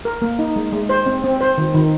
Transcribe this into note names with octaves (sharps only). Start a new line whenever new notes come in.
A#4
A#3
D#4
G#3
G#3
C5
C4
C4
C5
D#3
D#3